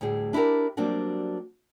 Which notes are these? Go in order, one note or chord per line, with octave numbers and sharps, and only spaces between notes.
D2 A2 G3 G#4
D4 E4 F4 G4 A#4
F#3 G3 A#3 C4 D4 F#4